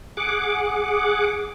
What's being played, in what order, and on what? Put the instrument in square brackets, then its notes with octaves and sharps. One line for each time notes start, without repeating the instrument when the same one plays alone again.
[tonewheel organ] G#4 F#5 D6